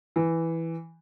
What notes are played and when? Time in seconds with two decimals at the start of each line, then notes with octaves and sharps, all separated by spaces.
0.16 E3